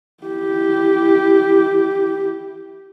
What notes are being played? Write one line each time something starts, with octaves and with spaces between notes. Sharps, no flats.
E4 G4